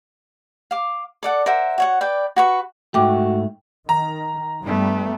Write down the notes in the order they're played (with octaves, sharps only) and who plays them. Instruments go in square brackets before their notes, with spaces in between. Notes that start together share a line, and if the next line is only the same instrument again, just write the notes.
[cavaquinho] F5 D6
A4 D5 F#5
A#4 C5 E5 F#5
F#4 C#5 F#5
B4 D5 G5
F#4 B4 C#6
[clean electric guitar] G#2 A3 [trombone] F#4 [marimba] G5 D6
[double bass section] D#3 [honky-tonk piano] A#5
[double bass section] G2 G3 [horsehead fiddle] A3 B3